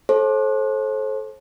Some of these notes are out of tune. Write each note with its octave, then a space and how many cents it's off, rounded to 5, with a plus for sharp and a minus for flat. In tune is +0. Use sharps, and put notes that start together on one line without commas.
A4 -25 C5 +40